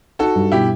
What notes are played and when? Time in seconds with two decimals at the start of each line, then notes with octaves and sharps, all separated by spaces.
0.19 D#4 F#4 A4
0.35 G2
0.52 B2 E4 G4